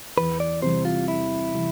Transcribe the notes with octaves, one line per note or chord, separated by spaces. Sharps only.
E2 B4
D5
C3 E3 G3 C5
F4
E2 E4
C3 E3 G3